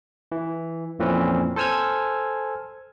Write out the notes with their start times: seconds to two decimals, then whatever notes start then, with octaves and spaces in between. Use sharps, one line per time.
0.32 E3
0.99 F2 A#2 E3 C4 C#4 B4
1.56 A4 C5 G#5 E6 F6 G#6